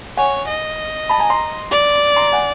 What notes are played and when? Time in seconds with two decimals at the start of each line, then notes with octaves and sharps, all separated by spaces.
0.17 C#5 F#5 G#5
0.48 D#5
1.09 A5 B5
1.19 G#5 A#5
1.30 A#5 C6
1.71 D5
2.16 A#5 C6
2.32 F#5 G#5